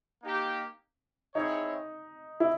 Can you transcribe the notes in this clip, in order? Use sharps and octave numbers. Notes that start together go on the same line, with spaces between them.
A#3 D#4 G4
C4 D#4 E4 G#4 C#5
E4